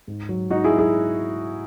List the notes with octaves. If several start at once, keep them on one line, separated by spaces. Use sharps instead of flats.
G#2
F#3
G#2 D#4 F#4
E4 G#4
F#3
E4 G#4